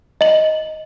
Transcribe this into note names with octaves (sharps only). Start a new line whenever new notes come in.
D#5 F#7